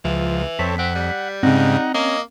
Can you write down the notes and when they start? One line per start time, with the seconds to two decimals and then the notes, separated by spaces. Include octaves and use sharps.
0.04 C#2 E3 F3
0.59 F2 C4 A4 C#5 B6
0.79 C4 F#5
0.96 G3
1.43 G#2 C#3 C4 D#4 F#5 A#5
1.94 A#3 C#4 D#5